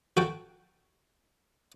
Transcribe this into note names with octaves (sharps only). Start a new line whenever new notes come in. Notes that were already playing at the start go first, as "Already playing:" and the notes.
F#4 A4 G5